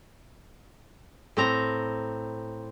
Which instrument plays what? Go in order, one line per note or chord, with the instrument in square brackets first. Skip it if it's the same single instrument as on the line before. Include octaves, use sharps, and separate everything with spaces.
[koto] A2 C4 A#5